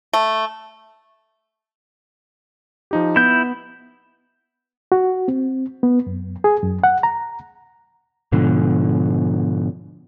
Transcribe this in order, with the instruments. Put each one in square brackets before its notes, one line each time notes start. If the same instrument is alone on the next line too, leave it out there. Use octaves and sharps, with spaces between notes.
[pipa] A3
[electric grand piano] F3 D#4 G4
[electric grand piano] B3 [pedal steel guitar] E4 G6
[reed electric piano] F#4
C4
B3
F#2
G#4
F#2
F#5
A#5
[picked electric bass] G#2 B2 D3 F3